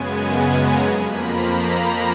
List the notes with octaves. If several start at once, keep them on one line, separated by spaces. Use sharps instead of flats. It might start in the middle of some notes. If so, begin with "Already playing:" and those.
Already playing: F#2 C#3 G#3 B3 G#5
A#5
F2 F3 A#3 B5
A#5